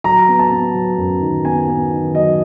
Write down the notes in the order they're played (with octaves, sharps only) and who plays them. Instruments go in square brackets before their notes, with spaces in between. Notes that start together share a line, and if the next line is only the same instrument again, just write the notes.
[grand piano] F#3 A#5
B3
A5
B3
F#3
F#2
D#3
B3 G#5
B3
D#3
F#3 D#5